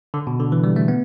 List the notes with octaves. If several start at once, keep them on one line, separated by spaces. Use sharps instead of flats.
D3
B2
D3
E3
G3
A3
B3